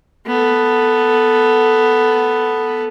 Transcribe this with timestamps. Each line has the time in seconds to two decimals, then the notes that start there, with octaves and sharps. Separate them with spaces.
0.26 B3 A4